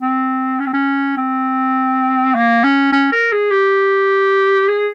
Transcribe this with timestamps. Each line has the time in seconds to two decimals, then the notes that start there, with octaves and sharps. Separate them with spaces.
0.01 C4
0.60 C#4
0.66 C4
0.73 C#4
1.17 C4
2.35 A#3
2.64 C#4
2.93 C#4
3.12 A#4
3.33 G#4
3.51 G4
4.69 G#4